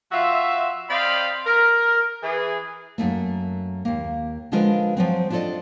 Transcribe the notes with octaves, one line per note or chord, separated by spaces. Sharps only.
F3 F4 F#4 E5
C4 C5 D5 D#5 F5 B5
A#4
E3 G#4
F#2 B2 A3 A#3
D#2 A#3
D3 F3 G#3 F4 A#4 B4
F3 F#3 C4
D4 E4 F4 A4 D5 D#5